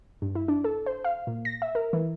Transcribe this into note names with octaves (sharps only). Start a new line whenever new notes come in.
G2
E4
D4
A4
C5
F5
A#2
A#6
E5
A#4
E3